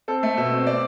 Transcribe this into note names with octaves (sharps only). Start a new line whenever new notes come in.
C4 A4
A3
B2 E5
C4
D5